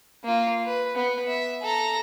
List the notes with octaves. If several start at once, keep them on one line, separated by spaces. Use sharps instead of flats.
A#3 F4
B4
B3
E5
A4 A#5